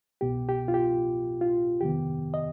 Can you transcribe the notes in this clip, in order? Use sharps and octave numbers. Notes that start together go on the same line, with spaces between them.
C2 B2 B3 G4
G4
F4
G4
F4
F2 C3 D#3 B3 G4
D#5